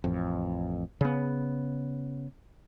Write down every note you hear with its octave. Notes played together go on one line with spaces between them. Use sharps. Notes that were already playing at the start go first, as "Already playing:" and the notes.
A1 F2
C#3 B3